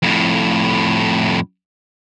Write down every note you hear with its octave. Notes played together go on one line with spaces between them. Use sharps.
F2 A2